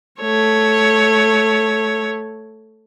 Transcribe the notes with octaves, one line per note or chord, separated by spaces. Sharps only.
A3 C#5